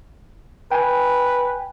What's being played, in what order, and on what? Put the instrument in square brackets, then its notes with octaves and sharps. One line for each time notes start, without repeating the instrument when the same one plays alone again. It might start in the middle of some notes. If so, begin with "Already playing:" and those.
[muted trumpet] B4 [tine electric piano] G5 G#5